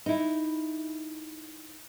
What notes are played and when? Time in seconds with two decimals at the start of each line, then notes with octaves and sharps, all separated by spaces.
0.06 D#4 E4